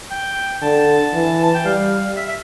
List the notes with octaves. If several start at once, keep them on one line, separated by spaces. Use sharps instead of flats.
G5
D3 A5
E3
A5
G5
G3 F5
E5
E5